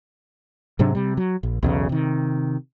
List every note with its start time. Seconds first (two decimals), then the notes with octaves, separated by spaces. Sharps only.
0.79 G#2 C3 F#3 D4
0.95 C3 G3
1.17 F#3
1.43 A#1
1.63 B1 E2 C#3
1.89 C3 D#3